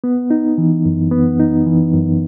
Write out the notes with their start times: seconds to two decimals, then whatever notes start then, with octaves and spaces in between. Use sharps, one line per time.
0.04 B3
0.30 D#4
0.58 E3
0.85 F#2
1.11 B3
1.39 D#4
1.66 E3
1.93 F#2